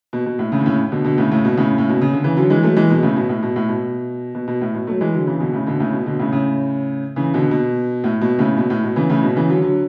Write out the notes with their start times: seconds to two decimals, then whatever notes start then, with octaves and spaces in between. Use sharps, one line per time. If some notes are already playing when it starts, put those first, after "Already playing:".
0.13 B2
0.26 B2
0.39 A2
0.52 A2 C#3
0.60 D3
0.66 A2 C#3
0.92 B2 D3
1.04 B2 D3
1.18 A2 C#3
1.31 A2 C#3
1.45 B2
1.57 A2 C#3
1.78 A2
1.89 B2
2.02 C#3
2.13 D3
2.24 C#3 E3
2.37 D3 F#3
2.50 E3 G#3
2.63 F#3 A3
2.76 E3 G#3
2.90 B2
3.02 A2 C#3
3.16 B2
3.29 A2
3.43 B2
3.56 A2
3.69 B2
4.35 B2
4.48 B2
4.61 A2
4.75 B2
4.87 F#3 A3
5.01 E3 G#3
5.14 D3 F#3
5.27 C#3 E3
5.40 B2 D3
5.53 A2 C#3
5.67 B2 D3
5.80 A2 C#3
5.93 B2
6.06 B2 D3
6.19 A2 C#3
6.32 A2 C#3
7.16 C#3 E3
7.34 B2 D3
7.51 B2
8.04 A2
8.21 B2
8.39 A2 C#3
8.57 B2
8.70 A2
8.83 B2
8.96 C#3 E3
9.10 A2 C#3
9.23 B2
9.36 C#3 E3
9.49 D3 F#3
9.62 D3 F#3